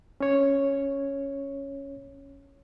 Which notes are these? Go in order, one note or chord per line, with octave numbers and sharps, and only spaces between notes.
C#4 C#5